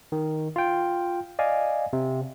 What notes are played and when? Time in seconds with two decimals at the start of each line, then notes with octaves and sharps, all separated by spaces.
0.12 D#3
0.56 F4 G5
1.39 D5 D#5 F5 G#5
1.93 C3